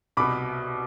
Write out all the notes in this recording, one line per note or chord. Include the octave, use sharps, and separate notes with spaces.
C2 B2 B5 D6